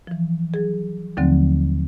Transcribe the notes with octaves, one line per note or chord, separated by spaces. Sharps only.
E3 F3
F#3 G#4
D#2 D3 F3 F#3 A3 C4